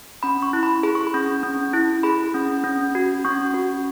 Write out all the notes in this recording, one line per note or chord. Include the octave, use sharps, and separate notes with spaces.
C#4 B5
C#6
E4
B5
G#4 B5
C#6
B5
C#4
C#4
E4
G#4 B5
C#4
C#4
F#4
C#4 C#6
F#4